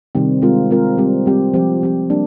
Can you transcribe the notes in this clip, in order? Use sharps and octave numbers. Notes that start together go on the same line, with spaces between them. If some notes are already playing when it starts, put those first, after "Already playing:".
C3 D#3 G3 C4
G#3 C4 F4 A#4
G#3 C4 F4 A#4
G3 C4 G4
G3 C4 G4
F3 C4 G4
F3 C4 G4
G3 A#3 D4